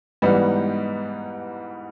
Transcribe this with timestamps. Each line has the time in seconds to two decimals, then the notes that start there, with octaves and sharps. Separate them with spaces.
0.22 G#2 E3 G3 B3 D#4